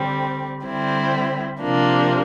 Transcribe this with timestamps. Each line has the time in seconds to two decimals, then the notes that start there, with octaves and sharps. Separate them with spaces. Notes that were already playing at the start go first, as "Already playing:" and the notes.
Already playing: D3 G3 C4
0.65 D3 G3 C4 E4
1.60 C3 F3 A#3 D4